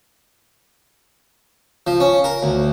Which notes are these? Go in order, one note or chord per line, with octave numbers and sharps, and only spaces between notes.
F3
C#4
A#4
D2